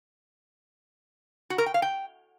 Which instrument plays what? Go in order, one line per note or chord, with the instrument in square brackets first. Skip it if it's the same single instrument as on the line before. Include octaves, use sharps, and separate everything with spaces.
[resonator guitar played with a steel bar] F#4
A#4
G5
F5
G5